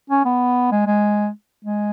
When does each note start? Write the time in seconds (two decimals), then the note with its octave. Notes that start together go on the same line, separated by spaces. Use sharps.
0.10 C#4
0.25 B3
0.72 G#3
0.87 G#3
1.65 G#3